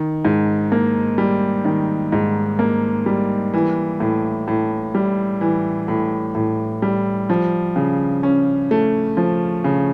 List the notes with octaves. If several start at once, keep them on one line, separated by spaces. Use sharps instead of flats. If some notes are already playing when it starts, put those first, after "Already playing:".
Already playing: D#3
G#2
A#3
G3
D#3
G#2
A#3
G3
E3
A2
A2
G3
E3
A2
A2
G3
F3
C#3
C#4
A3
F3
C#3